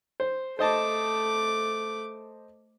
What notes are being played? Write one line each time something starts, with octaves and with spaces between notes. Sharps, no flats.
C5
A3 C5 D#5 A5 D6